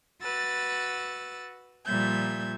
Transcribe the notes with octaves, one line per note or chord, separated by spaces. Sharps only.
F#4 B4 E6 A6
A#2 F3 G3 E5 G6 G#6